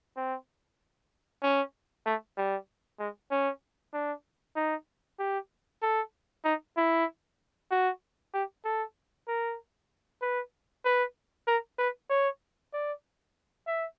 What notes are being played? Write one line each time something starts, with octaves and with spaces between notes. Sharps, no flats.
C4
C#4
A3
G3
G#3
C#4
D4
D#4
G4
A4
D#4
E4
F#4
G4
A4
A#4
B4
B4
A#4
B4
C#5
D5
E5